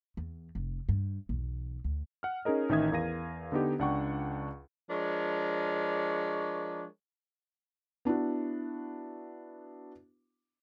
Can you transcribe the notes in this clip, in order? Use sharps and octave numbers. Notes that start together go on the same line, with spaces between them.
E2
F1
G2
B1 E2
D2
F#5 F6
C#4 D#4 G#4 A#4 D#5
A1 D#3 D#4 E5 D#6 G#6
E2 A#4 F5 A#6 D#7
D3 B3 D#4 G4
C#2 D4 F#5 G5 C#6
F3 G#3 D4 A#4 C#5
B3 D4 E4 F#4